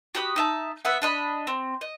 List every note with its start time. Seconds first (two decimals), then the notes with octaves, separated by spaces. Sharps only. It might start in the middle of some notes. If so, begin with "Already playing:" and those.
0.15 F#4 G4 B5 D#6
0.36 D#4 E5 A5
0.85 B3 E5 F#5
1.02 D4 D#5 B5
1.47 C4
1.81 D#5